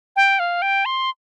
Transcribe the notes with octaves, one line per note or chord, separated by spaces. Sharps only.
G5
F5
G5
C6